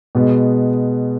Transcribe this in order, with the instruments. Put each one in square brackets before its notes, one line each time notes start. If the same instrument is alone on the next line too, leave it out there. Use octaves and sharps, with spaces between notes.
[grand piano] B2 G#3 B3